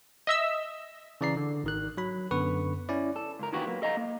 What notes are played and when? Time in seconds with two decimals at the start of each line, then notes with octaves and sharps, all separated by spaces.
0.27 D#5 E5 E6
1.21 C#3 E3 D5 A#5 C7
1.37 D3
1.64 G#1 D#3 F#6
1.98 F#3 B5
2.31 F#2 D3 B3 B4 C#6
2.89 C#4 E4 D5
3.16 A4
3.39 C#2 A#4
3.53 D#3 E3 A#3 B3 F#4 G4
3.67 F#3 A#3 B3
3.82 A4 D#5 F5 A#5
3.97 A#3